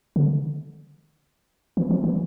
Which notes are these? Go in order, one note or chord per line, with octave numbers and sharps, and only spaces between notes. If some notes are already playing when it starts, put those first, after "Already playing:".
D3
E3
F3
E3